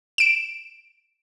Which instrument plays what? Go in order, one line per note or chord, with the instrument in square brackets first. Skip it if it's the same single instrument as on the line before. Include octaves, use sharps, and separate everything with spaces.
[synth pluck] D7 E7